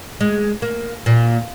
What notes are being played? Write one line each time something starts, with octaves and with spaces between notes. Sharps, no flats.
G#3
A#3
A#2